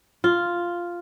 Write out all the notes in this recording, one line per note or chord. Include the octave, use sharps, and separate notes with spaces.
F4